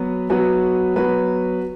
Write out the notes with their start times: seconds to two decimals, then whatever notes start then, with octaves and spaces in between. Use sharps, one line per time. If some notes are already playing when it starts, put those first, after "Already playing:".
Already playing: F#3 B3 F#4 B4
0.30 F#3 B3 F#4 B4
0.96 F#3 B3 F#4 B4